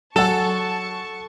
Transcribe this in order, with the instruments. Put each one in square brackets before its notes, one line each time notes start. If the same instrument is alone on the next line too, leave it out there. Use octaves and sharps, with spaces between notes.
[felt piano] F#3 G#5 [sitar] A4 [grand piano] F#5 E7 [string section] A5 C#6